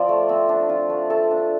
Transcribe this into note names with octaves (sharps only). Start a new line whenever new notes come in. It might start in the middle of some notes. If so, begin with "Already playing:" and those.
Already playing: F3 C4 F4 C5 D5
A3
C4
D4
F4
A3
A3 A4
D4